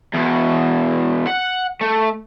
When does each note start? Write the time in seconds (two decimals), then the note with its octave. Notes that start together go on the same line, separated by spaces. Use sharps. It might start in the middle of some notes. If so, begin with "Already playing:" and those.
0.14 E2 B2
1.27 F#5
1.81 A3